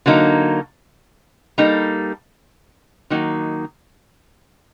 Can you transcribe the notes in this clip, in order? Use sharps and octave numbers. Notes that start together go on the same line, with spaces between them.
D3 F#3 A#3 D#4
G3 A#3 D#4 A4
D#3 F#3 A#3 D#4